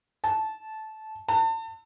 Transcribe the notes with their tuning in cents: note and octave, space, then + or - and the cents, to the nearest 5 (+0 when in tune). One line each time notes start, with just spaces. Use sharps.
A5 -15
A5 +35